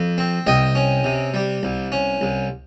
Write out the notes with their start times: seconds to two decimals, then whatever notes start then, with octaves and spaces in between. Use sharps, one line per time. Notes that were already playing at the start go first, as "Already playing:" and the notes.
Already playing: F2
0.18 C4
0.47 C2 D#5 G5
0.75 C#4
1.04 C3
1.34 G3
1.63 C2
1.92 C#4
2.21 C2